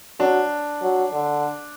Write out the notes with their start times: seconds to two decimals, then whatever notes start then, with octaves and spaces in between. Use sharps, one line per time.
0.19 F#3 D4
0.82 F#3
1.13 D3